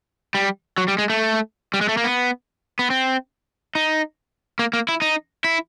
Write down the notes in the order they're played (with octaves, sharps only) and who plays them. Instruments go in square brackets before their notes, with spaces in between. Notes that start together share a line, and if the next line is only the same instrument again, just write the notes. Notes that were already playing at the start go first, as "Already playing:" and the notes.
[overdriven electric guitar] G3
F#3
G3
G#3
A3
G3
G#3
A3
A#3
B3
B3
C4
D#4
A#3
A#3
E4
D#4
E4